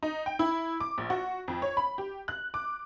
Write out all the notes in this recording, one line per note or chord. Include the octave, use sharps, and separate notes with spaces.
D#4
G5
E4
D6
A#1
F#4
F2
C#5
B5
G4
F#6
D6